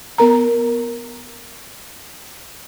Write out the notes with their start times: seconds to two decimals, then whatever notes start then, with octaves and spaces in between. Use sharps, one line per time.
0.18 B3 A#4 A#5